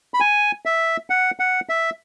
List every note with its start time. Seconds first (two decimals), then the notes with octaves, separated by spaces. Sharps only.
0.14 B5
0.20 G#5
0.65 E5
1.10 F#5
1.40 F#5
1.69 E5